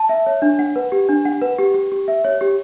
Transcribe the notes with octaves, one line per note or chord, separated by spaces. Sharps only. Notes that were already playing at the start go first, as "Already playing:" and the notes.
Already playing: A5
E5
C#5
D4
F#5
B4
G4
D4
F#5
B4
G4
G4
G4
E5
C#5
G4